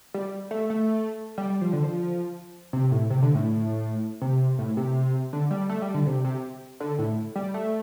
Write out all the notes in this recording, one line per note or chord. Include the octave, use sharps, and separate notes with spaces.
G3
A3
A3
G3
G3
F3
D3
F3
C3
A2
C3
D3
A2
C3
A2
C3
D3
G3
A3
G3
D3
C3
C3
D3
A2
G3
A3